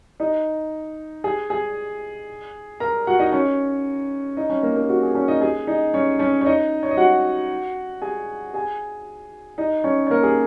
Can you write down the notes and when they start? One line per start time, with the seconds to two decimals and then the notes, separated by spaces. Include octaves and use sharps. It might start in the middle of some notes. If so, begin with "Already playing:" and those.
0.20 D#4 D#5
1.24 G#4 G#5
1.50 G#4 G#5
2.80 A#4 A#5
3.07 F#4 F#5
3.19 D#4 D#5
3.32 C#4 C#5
4.37 D#4 D#5
4.50 C#4 C#5
4.63 A#3 A#4
4.76 A#3 A#4
4.89 F#4
5.03 G#4
5.15 C#4 C#5
5.28 D#4 D#5
5.41 G#4 G#5
5.67 D#4 D#5
5.94 C#4 C#5
6.19 C#4 C#5
6.41 C#5
6.46 D#4 D#5
6.83 C#5
6.91 D#5
6.97 F#4 F#5
8.02 G#4 G#5
8.54 G#4 G#5
9.58 D#4 D#5
9.84 C#4 C#5
10.07 C#5
10.10 A#3 A#4
10.23 G#4